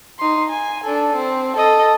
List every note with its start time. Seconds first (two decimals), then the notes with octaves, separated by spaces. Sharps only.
0.19 D#4 C6
0.50 G#5
0.84 D4 A4
1.16 C4
1.57 A4 D#5